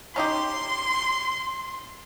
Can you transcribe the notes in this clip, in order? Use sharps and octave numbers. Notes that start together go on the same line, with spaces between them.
C#4 D#4 G4 C6